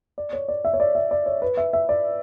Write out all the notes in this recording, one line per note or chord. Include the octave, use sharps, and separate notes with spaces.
D5
C#5
D5
E5
C#5
D5
E5
D5
C#5
B4
E5
E5
D5